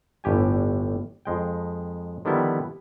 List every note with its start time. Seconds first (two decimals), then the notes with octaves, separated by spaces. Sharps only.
0.24 G1 A2 G4 G#5
1.25 F2 G#3 G5
2.25 D3 D#3 F3 G3 B3 E4